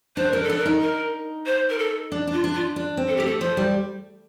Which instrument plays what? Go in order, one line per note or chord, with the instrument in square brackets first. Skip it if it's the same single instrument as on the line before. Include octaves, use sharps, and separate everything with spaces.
[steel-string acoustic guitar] D4 [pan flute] C5
[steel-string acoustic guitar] D4 [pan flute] A#4
[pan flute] A4
[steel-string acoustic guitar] D4
[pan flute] A#4
[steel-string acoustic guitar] D#4
[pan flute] A#4
C5
A#4
A4
[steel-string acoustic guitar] D4
D4
[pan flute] F4
[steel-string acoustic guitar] D4
[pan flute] F4
[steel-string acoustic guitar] D4
C4
[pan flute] A4
G4
[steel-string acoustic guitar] A3
[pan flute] A4
[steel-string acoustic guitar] F3 [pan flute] C5
[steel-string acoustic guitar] G3